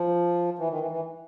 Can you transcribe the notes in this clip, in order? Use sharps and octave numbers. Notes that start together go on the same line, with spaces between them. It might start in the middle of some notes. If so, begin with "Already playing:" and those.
Already playing: F3
E3
D#3
E3
E3